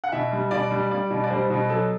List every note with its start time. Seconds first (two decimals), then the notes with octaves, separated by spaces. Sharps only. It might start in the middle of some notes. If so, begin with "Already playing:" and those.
0.04 F#5
0.12 B2 E5
0.32 G3
0.51 B2 D5
0.71 G3
0.91 G3 D5
1.10 B2
1.24 D5
1.30 G3 C5
1.50 B2
1.69 F#3 A4